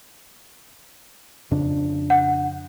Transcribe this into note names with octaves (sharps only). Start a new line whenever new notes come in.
F2 C#3 D4
F#5